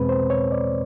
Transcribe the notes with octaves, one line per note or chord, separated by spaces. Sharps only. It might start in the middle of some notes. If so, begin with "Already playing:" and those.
Already playing: E2 B2 G#3 C4 B4
C5
C#5
D5